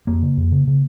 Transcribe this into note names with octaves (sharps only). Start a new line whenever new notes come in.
F2 A#3
C#3
F2
C#3
C#3